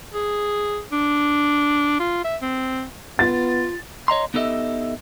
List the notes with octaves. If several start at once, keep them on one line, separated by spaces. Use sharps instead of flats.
G#4
D4
F4
E5
C4
B3 F4 A6
C#5 D#5 A#5 C6
B3 D#4 G4 A4 D#5 E5